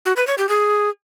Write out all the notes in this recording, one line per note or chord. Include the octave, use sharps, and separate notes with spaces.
F#4
B4
C#5
G4
G#4